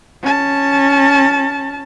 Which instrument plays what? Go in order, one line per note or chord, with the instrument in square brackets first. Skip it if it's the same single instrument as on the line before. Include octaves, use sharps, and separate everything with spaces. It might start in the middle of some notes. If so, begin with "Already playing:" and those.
[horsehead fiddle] C#4 A5